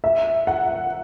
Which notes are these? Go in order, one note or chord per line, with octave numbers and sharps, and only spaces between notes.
E5
F#5